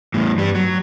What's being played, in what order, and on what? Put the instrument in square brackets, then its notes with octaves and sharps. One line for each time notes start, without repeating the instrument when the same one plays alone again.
[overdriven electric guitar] E2 A2
G2 G3
F#3